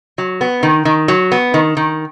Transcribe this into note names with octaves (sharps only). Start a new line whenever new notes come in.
F#3
B3
D#3
D#3
F#3
B3
D#3
D#3